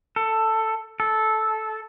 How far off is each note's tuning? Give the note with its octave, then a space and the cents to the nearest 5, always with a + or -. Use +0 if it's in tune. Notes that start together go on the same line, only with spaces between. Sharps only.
A4 +10
A4 -10